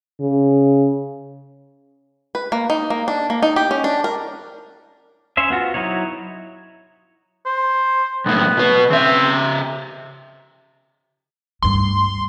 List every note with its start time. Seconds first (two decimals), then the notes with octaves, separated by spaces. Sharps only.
0.20 C#3
2.35 B4
2.52 A#3
2.70 D#4
2.90 A#3
3.08 D4
3.30 A#3
3.42 D#4
3.56 G4
3.71 C#4
3.84 D4
4.04 A#4
5.37 C#4 C5 C#5 E5
5.50 B3 F4 F#4
5.74 F#3 D#4 E4 C#5
7.46 C5
8.26 B1 A2 B3
8.57 B2 B4
8.90 C#3 C4 E5
11.63 D2 G2 C6